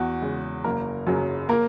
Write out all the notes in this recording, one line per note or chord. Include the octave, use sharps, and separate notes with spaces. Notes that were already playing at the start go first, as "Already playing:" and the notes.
Already playing: E2 F#4
C#3 G#3
F#1 A#3 A#4
F#2 C#3 F#3
A#3 A#4